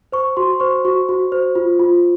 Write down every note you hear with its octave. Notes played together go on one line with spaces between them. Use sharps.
C5 C#6
F#4 C6
C5 C#6
F#4 C#6
F#4
C5
F4
F4